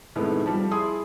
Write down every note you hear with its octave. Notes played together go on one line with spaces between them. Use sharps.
A2 C3 D#3 G#3 A3 B3
F3 G3 A3
E4 G#4 C6 D#6